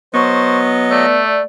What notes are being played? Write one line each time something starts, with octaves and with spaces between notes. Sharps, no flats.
F#3 B3 C5 D#5 C#6
A3 D5